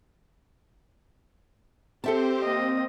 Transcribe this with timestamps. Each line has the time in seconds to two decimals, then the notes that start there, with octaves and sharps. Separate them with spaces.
2.04 C4 G4 A4 C5 E5 A5
2.41 A#3 D#5